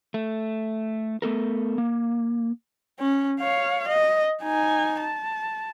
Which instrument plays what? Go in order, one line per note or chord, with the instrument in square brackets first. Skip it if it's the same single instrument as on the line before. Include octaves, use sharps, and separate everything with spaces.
[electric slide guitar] A3
A3 B3 A4 A#4
A#3
[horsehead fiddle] C#4
C#5 F5
D#5
D#4 G#5
A5